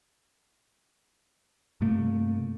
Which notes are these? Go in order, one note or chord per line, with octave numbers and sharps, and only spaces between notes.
G2 C3 A3 A#3